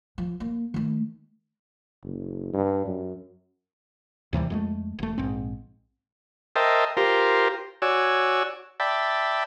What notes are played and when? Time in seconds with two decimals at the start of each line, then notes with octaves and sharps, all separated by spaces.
0.18 F3
0.40 A#3
0.74 D#3 A3
2.03 F#1
2.53 G2
2.85 F#2
4.33 D#2 C3 E3 G3
4.50 F2 G#3 A3
4.99 E1 A3
5.18 A#1 G#2 C4
6.56 A#4 C5 D#5 E5 G5 A5
6.97 F4 G4 A#4 C5
7.82 F#4 C#5 D5 G#5 E6
8.80 D5 E5 G5 A5 B5